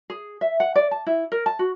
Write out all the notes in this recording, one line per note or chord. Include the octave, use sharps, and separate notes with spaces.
G#4
E5
F#5
D5
A5
E4
A#4
A5
F#4